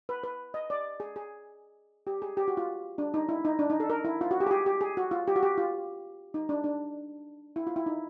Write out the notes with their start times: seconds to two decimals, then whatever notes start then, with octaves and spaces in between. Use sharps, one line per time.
0.09 B4
0.24 B4
0.54 D#5
0.70 D5
1.00 G#4
1.16 G#4
2.07 G4
2.22 G#4
2.37 G4
2.48 F#4
2.57 F4
2.98 D4
3.14 D#4
3.29 E4
3.45 D#4
3.59 D4
3.70 D#4
3.80 A4
3.90 A#4
4.05 E4
4.21 F4
4.31 F#4
4.40 G4
4.47 G#4
4.51 G4
4.66 G4
4.81 G#4
4.97 F#4
5.11 F4
5.28 G4
5.36 F#4
5.43 G4
5.58 F4
6.34 D#4
6.49 D4
6.64 D4
7.56 E4
7.67 F4
7.76 E4
7.86 D#4